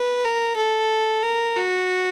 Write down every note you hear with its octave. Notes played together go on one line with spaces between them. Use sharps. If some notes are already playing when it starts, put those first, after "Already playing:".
Already playing: B4
A#4
A4
A#4
F#4